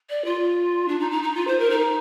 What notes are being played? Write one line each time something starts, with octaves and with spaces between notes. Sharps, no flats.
D5
F4
D4
D#4
D#4
D#4
F4
C5
A#4
D#4